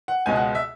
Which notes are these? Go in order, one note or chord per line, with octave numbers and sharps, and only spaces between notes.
F#5
C#2 B2 G#3 G#5
F#5
E5